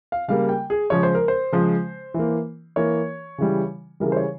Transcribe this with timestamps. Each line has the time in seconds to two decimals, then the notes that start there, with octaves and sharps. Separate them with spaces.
0.12 F5
0.28 C#3 G3 A#3 F5
0.49 G5
0.70 G#4
0.90 C#3 F3 G#3 C#5
1.03 C5
1.15 A#4
1.28 C5
1.52 C#3 F3 G#3
2.14 E3
2.19 A#3
2.76 E3 A#3 C#5
3.38 C#3 E3 G3
4.00 C#3 E3 G3 A#4
4.12 C5
4.17 C#5